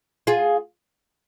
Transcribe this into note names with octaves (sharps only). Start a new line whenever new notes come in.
F4 G#4